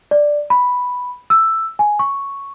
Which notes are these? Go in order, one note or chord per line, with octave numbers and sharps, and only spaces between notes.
D5
B5
E6
G#5
C#6